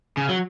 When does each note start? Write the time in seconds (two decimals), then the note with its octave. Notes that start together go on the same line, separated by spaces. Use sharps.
0.17 C#3
0.29 F#3